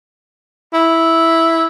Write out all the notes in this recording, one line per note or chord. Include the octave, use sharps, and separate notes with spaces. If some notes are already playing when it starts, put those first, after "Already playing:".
E4